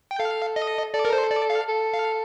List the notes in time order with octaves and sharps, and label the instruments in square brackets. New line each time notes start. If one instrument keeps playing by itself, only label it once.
[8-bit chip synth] G5
[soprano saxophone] A4 [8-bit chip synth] F5
[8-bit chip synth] D#5
[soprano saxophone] A4 [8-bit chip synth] D5
[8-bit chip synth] A#4
C5
D5
F5
[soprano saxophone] A4
[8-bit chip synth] F5